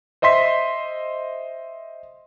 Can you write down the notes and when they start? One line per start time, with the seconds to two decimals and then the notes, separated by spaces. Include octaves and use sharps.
0.22 C5 D#5 E5 C6 B6